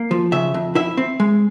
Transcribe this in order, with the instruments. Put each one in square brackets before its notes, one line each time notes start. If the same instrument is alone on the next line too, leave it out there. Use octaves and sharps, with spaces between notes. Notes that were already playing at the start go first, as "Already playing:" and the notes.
Already playing: [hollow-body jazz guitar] A#3
F3
C#3 E5
F2
E4 E5
C4
G#3